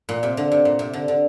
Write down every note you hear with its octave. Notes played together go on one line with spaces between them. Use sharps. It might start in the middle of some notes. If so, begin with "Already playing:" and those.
A#2
C3
D3
C3
A#2
C3
D3
D3